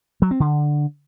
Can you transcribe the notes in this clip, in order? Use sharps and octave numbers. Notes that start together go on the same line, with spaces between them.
F#3
C4
D3